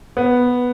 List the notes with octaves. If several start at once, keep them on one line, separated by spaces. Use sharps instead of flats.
B3